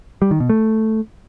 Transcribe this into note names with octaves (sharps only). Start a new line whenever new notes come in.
G3
D#3
B2
A3